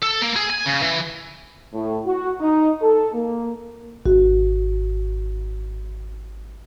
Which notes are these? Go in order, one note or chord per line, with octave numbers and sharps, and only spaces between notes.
A4
A#3
G#4
G#5
C#3
E3
A2
F#4
D#4
A4
A#3
G#1 F#4